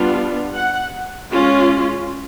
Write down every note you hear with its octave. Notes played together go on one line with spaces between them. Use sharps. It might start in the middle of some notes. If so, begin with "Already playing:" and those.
Already playing: G3 B3 D4 F4
F#5
G#3 C#4 F4